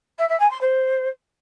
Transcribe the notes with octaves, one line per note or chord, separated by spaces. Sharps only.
E5
E5
G#5
C6
C5